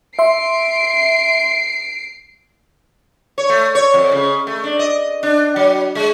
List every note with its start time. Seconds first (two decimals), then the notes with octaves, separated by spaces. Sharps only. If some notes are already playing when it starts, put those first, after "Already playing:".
0.19 E5 C6 C7 D7
3.38 C#5
3.49 A3
3.75 C#5
3.94 F2
4.11 C#3
4.47 A3
4.64 D4
4.79 D#5
5.23 D4
5.56 F#3
5.95 G#3